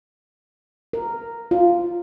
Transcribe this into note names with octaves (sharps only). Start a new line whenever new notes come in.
A#4
F4